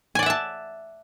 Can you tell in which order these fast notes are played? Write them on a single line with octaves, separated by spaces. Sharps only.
G#5 D5 F#5 E5 A5